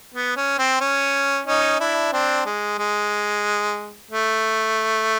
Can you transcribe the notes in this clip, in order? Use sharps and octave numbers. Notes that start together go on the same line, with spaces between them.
B3
C#4
C4
C#4
C#4 D#4
D4 E4
C4 D4
G#3
G#3
A3